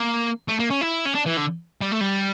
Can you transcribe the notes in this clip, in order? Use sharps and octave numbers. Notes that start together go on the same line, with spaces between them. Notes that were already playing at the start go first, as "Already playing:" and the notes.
Already playing: A#3
A3
A#3
C#4
E4
C#4
D4
E3
D3
G3
A3
G3